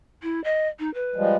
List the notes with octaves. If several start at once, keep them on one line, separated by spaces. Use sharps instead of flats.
E4
D#5
D#4
B4
F3 G3 G#3